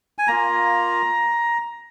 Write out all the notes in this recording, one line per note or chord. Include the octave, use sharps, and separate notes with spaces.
G#5
A#3 F4 A#5